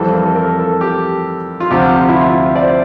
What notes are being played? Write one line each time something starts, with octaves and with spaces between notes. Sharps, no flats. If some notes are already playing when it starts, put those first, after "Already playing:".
Already playing: F2 E3 G3 C4 A4
A#4
A4
A#4
A4
G4
F4
D2 C3 F3 G4
E4
F4
D5
C5